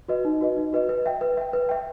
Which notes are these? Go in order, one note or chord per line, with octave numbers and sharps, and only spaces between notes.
F#4 B4 D#5
D#4
F#4 B4 D#5
D#4
F#4 B4 D#5
B4
E5 G5
B4
E5 G5
B4
E5 G5